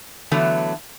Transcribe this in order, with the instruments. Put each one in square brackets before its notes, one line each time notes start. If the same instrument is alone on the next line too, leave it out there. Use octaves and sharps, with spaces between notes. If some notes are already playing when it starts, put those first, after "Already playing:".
[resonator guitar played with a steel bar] D3 E3 F#3 A3 B3